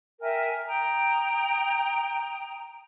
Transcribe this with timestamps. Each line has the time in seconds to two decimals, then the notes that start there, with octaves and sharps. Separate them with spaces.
0.21 A#4 E5 G5 G#5
0.66 G5 A#5 D#6